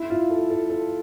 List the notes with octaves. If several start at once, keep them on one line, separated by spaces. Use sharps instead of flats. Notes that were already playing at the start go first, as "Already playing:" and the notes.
Already playing: E4
F4
A4
A4
A4